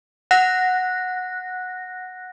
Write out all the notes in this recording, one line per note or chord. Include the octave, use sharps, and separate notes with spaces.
F#5 F#6 A#6